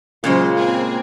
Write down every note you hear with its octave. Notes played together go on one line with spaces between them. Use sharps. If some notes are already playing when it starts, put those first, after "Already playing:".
A#2 C#3 F#3 G#3 F4 C5
A#3 C4 G#4